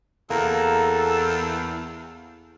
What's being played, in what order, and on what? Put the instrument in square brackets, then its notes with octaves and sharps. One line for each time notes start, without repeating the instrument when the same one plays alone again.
[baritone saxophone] E2 [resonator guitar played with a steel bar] A#3 [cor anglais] A4